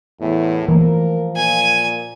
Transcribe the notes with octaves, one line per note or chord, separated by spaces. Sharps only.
E2 A2
E3 F3 A3 A#3 A#4
A#2 G#5